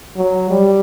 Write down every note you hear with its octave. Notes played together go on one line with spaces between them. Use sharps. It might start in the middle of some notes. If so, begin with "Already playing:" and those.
F#3
G3